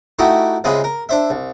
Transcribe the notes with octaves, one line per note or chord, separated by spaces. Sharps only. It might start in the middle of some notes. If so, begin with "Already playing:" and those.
A3 D#4 E4 F#4 G4
C#2 C3 G#3 G#4 B4 F5
A#4
D4 C5 E5
C2